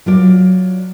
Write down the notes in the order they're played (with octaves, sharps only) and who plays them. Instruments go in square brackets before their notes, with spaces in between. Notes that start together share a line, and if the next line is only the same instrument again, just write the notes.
[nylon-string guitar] F#3 F4 D5